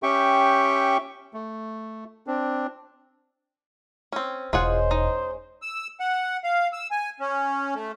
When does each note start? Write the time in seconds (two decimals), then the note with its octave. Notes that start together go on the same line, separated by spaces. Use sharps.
0.03 C#4 G4 E5 G5 C#6
1.34 A3
2.27 C4 D4
4.13 C4 C#4
4.53 E1 G#3 C#4 F4 G#4 C5 F#5
4.91 D#4
5.62 E6
6.00 F#5
6.44 F5
6.73 E6
6.91 G#5
7.20 C#4
7.74 A3